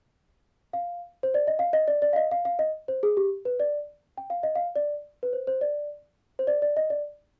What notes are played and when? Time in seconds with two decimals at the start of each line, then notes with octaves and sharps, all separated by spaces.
0.73 F5
1.23 C5
1.34 D5
1.47 D#5
1.59 F5
1.73 D#5
1.88 D5
2.02 D5
2.13 F5
2.16 D#5
2.31 F5
2.45 F5
2.59 D#5
2.88 C5
3.03 G#4
3.17 G4
3.45 B4
3.60 D5
4.17 G5
4.30 F5
4.43 D#5
4.55 F5
4.76 D5
5.23 B4
5.33 C5
5.47 C5
5.61 D5
6.39 C5
6.47 D5
6.62 D5
6.77 D#5
6.90 D5